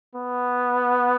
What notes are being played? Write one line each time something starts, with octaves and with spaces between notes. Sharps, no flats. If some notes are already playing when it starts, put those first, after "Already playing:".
B3